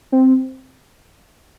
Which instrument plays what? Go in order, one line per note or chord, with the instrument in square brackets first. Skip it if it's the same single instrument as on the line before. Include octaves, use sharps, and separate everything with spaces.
[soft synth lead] C4